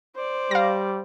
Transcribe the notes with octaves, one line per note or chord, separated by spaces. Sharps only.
C5 D5
G3 F5 A#6